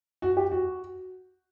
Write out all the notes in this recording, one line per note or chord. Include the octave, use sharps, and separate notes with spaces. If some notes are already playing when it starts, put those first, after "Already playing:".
F#4
G4
F#4